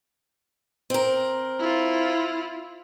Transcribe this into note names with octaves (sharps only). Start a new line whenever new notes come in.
C4 A#4
E4 F4